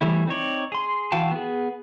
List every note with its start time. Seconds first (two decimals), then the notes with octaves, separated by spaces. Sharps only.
0.01 E3 G3 A3 E4
0.27 C4 D#4 C#5 D5
0.72 G#4 C6
1.12 E3 F#4 F5 G5 A5
1.31 B3 G#4